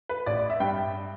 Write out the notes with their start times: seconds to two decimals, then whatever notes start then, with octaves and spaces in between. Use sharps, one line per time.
0.09 B4
0.26 A1 D5
0.39 D5
0.50 E5
0.60 G2 G5